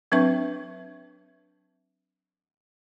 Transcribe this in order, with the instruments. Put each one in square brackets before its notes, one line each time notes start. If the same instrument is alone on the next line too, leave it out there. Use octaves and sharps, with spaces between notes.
[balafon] F#3 C4 D4 B4 E5 C#6